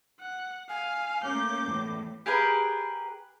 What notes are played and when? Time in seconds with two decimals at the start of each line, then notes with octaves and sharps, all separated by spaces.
0.21 F#5
0.69 F5 G#5
1.24 A3 A#3 C#4 D6 G6
1.65 E2 A2
2.26 G4 G#4 A#4 B4